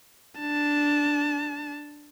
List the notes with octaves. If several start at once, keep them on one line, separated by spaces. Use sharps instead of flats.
D4 A5